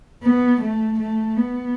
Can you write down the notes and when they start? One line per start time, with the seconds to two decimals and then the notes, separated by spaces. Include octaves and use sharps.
0.23 B3
0.61 A3
1.00 A3
1.37 B3